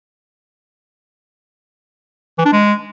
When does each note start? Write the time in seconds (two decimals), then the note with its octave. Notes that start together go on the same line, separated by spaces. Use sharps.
2.38 E3
2.45 D4
2.52 G#3